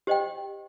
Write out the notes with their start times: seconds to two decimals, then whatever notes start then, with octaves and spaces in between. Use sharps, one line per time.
0.07 G4 C5 D#5 G5